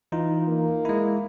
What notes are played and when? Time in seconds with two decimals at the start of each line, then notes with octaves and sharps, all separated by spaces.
0.12 E3 D#4 F4
0.48 A#3
0.85 G#3 E4